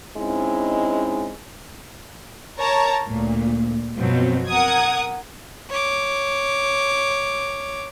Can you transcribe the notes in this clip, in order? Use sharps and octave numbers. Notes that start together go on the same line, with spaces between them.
G#3 C4 C#4 D#4 E4
A#4 C#5 A5 A#5
D2 A#2
F#2 B2 F3 F#3 C4
A#4 F#5 D#6 G#6
C#5 D6